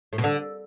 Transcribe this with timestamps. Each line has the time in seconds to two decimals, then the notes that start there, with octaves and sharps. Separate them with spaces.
0.13 A2
0.18 B2
0.24 D3